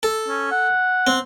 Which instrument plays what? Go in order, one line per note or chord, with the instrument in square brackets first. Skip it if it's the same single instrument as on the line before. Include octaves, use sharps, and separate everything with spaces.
[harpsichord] A4
[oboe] C#4
F#5
[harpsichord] C4